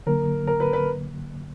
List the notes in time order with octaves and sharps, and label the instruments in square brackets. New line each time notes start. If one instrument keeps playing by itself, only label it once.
[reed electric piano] D3 F#3 A#3 [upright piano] A#4
[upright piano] A#4
B4
B4